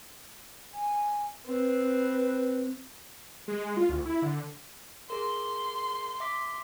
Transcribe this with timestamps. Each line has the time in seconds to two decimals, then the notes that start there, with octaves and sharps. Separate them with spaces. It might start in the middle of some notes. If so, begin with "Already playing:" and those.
0.74 G#5
1.46 C4 B4
3.48 G#3
3.77 F4
3.90 D2
4.05 E4
4.22 D3
5.10 G#4 A#4 C6
6.20 E5 D6 B6